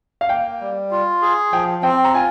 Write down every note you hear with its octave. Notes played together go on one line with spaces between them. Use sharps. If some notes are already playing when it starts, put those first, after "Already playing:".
F5
A#3 G5
G3
F4
G#4
F3 G5
C4 G5
A#5
F4 G#5